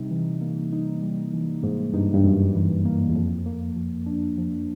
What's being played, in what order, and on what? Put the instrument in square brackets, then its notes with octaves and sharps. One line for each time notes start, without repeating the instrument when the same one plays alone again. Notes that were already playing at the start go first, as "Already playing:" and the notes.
Already playing: [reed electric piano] C3 [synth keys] G3 D#4
[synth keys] E3
A#3
D#4
G3
E3
[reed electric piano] G#2 [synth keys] A#3
[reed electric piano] G2 [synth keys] D#4
[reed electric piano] G2
[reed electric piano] F#2 [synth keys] G3
[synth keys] E3
A#3
[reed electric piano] E2
[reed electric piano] F2 [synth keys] F3
[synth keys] A#3
F3
D4
F3